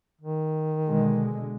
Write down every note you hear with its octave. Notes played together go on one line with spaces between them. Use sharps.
D#3
B2 D3 G#3